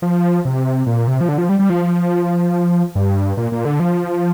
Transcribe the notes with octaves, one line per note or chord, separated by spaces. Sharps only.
F3
C3
A#2
C3
F3
D3
F3
G3
G3
F3
G2
A#2
A#2
D3
F3